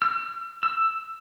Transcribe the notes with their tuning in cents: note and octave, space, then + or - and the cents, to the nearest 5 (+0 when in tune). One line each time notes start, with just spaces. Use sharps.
E6 +45
E6 +5